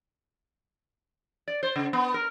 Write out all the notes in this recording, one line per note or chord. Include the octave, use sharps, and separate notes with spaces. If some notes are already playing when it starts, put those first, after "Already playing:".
D5
C5
C#3
B3
A#4